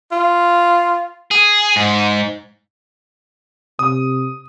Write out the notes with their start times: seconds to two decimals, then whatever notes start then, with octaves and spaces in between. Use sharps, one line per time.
0.12 F4
1.31 G#4
1.76 G#2
3.79 C3 D#6